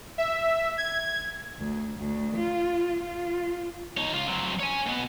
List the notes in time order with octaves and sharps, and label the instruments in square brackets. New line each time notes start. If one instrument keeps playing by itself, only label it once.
[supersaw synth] E5
G#6
[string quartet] D2
D2
F4
F4
[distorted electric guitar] D#4 C#5
C#2 F4
F#3 C4
C#5 G#5
B2 B3